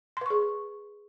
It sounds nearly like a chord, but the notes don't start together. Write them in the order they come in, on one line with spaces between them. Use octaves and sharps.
C6 B4 C#6 G#4